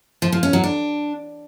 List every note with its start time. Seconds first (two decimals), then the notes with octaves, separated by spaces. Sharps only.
0.22 F3
0.32 F3
0.43 C#4
0.53 F#3
0.64 D4